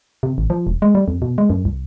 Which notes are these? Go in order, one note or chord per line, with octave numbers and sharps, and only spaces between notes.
C3
A1
F3
E1
G#3
G3
F2
B2
G#3
F#2
C2